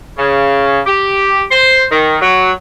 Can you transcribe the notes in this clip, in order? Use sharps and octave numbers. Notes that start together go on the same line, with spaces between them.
C#3
G4
C5
D#3
F#3